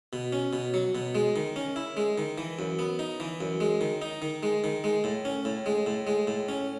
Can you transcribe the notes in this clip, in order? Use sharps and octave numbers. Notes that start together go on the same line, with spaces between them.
B2
C#4
B2
F#3
B2
G#3
D#3
C#4
E4
G#3
D#3
E3
F#2
B3
D#4
E3
F#2
G#3
D#3
D#4
D#3
G#3
D#3
G#3
A2
C#4
A2
G#3
A2
G#3
A2
C#4